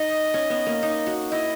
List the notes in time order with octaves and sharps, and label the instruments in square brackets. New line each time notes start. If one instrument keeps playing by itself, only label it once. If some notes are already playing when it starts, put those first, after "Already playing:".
Already playing: [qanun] D#4 [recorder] D#5
[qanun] C#4
B3
A#3
D#4
F#4
[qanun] E4 [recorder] D#5